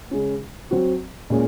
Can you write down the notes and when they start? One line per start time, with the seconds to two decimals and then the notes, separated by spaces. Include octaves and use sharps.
0.11 C#3 G#3 C#4
0.71 F#3 C4 F#4
1.30 A#2 G#3 C#4